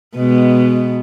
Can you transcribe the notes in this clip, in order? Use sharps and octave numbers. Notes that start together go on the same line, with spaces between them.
B2 G#3 B3